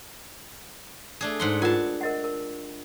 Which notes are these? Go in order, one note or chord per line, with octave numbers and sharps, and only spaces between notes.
A3 D4 G#4
G#2 F#5 C6
F4 A#4 F#5 G#5 A5
A#4 D#5 F#5
A#4